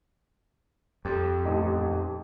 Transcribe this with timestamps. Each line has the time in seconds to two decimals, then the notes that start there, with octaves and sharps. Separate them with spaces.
1.05 F2 G4
1.45 D#1 A1 D#4